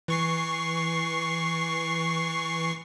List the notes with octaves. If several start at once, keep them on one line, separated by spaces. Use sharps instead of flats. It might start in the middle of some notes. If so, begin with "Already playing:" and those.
E3 C#6 C7